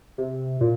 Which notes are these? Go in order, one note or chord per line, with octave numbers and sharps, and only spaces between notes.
C3
A#2